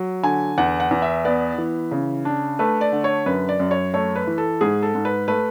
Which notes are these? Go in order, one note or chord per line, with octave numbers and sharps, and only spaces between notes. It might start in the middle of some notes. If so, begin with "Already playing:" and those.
Already playing: F#3
D3 G#5
E2 F#5
F#5
E2
E5
B3 D5
E3
C#3
D4
A3 B4
D5
D3
C#5
F#2 B4
D5
F#2
C#5
A3 C#5
B4
E3
A4
G#2 G#4
A4
G#2
B4
A3 B4